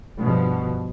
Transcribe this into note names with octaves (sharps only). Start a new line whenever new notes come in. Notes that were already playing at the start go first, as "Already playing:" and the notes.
G2 B2 F3